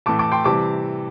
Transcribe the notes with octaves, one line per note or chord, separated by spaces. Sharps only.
A2 E3 A3 A5 D6
A5 D6
G5 C6
C3 E3 G3 A5 D6